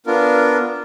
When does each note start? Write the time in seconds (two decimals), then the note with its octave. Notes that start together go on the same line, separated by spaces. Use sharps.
0.06 B3 D4 F4 A#4